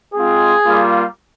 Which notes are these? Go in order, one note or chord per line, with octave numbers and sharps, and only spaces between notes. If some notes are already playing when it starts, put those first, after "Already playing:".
G#3 C4 F4 G#4
G3 A#3 F4